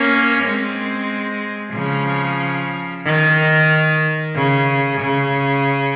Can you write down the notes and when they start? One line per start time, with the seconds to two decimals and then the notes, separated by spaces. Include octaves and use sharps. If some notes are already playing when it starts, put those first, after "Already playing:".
Already playing: A#3 C#4
0.44 G#3 C4
1.74 C#3 F3
3.05 D#3
4.36 C#3
5.01 C#3